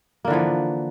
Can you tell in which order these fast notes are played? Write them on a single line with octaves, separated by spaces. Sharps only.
A#3 D3 E3 F3